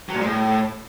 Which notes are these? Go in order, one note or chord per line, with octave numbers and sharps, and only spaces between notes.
F#3
A#2
G#3
A2